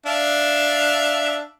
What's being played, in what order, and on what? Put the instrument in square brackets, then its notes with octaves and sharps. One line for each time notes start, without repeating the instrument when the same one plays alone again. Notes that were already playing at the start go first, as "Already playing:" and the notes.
[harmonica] D4 E5 F5